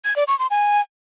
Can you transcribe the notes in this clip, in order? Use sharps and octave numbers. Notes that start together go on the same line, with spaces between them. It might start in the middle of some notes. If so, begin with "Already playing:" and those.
G#6
D5
C#6
C6
G#5